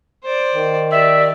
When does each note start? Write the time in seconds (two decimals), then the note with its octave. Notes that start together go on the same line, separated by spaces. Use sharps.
0.23 C5 D5
0.54 D#3
0.91 G4 D5 E5